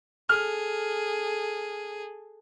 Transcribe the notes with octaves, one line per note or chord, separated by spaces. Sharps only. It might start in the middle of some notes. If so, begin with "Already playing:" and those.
G#4 A4 F6